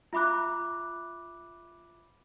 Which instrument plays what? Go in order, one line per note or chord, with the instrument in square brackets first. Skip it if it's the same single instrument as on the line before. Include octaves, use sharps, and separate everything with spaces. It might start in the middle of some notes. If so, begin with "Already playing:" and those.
[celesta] F4 E5 B5 D6 F#6